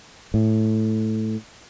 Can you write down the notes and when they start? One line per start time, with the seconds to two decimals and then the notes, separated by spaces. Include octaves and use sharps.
0.34 A2